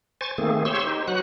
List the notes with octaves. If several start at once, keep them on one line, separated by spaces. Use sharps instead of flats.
C5 G#5 C#6 A6
D#3 A3 A#3 C4 G#4
G4 C5 C#5 C6 C#6 E6
D#4 G4 C5
F#3 F#4 B4 F#5 F#6